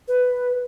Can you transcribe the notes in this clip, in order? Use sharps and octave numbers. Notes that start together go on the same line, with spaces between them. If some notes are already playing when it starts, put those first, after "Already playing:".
B4